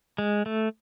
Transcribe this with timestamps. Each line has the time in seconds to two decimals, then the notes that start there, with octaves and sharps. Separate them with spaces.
0.18 G#3
0.46 A3